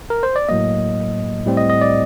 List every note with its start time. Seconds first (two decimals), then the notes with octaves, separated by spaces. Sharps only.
0.10 A#4
0.23 C5
0.36 D5
0.49 A2 F#3 A#3 D#5
1.46 A2 G3 C4
1.57 D#5
1.70 D#5
1.82 D5